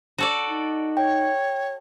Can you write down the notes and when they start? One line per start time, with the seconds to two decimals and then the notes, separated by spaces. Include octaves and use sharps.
0.18 F#4 A4 D5
0.50 D#4
0.97 C#5 G5